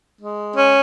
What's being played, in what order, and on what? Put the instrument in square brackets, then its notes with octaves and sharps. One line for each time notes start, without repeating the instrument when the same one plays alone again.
[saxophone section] G#3
C#4